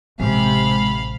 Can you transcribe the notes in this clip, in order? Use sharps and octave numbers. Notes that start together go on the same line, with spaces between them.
A1 C3 G#3 F5 B5